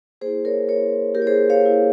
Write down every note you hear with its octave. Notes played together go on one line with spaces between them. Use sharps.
A#3 E4 G#4 C5
A#4 C#5
A#3 E4 A#4 C#5
A#3 G4 A#4
E4 C#5
G#4 C5
C#5 F5
A#3 E4